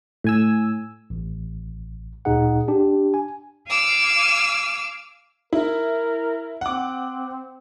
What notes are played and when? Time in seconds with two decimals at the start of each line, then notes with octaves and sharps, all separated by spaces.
0.24 A2 G#5 E6
1.10 A1
2.25 D2 A#2 D#4 G#4 F#5
2.68 D4 G4
3.14 G#5
3.68 F5 G#5 D6 E6 F6
5.53 E4 A#4
6.61 C4 F#5 D6